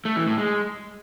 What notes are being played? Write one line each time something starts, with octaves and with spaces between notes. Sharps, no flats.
A3
E3
A2
G#3